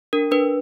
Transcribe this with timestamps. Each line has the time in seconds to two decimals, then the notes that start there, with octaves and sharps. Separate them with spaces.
0.13 D4 A#4
0.31 D4 B4